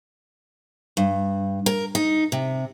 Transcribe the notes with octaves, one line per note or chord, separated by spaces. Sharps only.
G2
A#4
D#4
C3